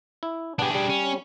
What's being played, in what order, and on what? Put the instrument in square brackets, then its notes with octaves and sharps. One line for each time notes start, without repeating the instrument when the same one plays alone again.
[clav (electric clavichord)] E4
[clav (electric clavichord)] B3 G4 [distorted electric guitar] D4 G#4
[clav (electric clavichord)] G3
[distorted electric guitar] C#4